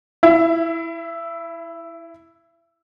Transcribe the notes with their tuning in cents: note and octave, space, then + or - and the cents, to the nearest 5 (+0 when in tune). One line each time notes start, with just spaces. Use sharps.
E4 +0 E5 +30